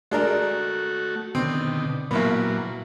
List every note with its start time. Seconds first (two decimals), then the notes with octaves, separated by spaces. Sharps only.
0.11 G#3 A3 D4 F#4 A#4
1.35 B2 D3 D#3 C4
2.11 A1 A#2 F#3 A#3 B3